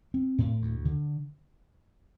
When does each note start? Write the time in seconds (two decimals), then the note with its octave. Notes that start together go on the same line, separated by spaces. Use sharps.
0.14 C4
0.38 A2
0.62 D2
0.85 D3